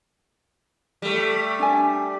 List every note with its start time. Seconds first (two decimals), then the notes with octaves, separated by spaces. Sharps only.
1.02 G3 A3
1.59 D4 D5 G#5